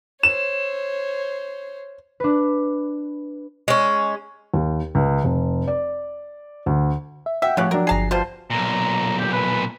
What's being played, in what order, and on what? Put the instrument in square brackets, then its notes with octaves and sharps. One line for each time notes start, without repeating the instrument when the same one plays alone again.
[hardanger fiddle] C5 C#5 [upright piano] E7
[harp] D4 B4
[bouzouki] G#3 C#4
[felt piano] D#2
C#2
F1
D5
D2
[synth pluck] E5
[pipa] E5 [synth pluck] F#5 G5 [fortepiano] E6
[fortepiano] A2 C#5 F#6 [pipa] C#3 G4 [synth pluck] F3
[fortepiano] F#3 D4 [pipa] A#4
[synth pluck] G1 C7 [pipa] G#4 A5 A#5
[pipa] B2 G3 C5 [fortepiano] F4 [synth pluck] A5
[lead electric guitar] B1 A#2 [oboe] A#5
[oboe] G4
B4